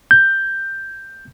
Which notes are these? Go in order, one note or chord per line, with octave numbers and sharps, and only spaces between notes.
G6